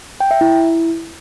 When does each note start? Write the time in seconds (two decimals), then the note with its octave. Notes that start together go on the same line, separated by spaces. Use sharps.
0.20 G5
0.31 E5
0.41 E4